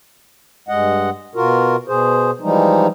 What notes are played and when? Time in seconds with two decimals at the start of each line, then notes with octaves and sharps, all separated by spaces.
0.69 G2 G#3 D#5 F#5
1.35 B2 F4 F#4 A#4
1.88 B2 G#4 C5
2.41 E3 F3 G3 G#3 D#4